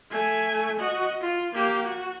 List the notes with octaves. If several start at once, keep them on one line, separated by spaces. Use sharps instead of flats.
A3 G#5
F#4 D#5
F4
A#3 G4
F#4